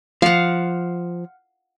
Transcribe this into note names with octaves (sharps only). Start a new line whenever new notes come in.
F3 F5 F#5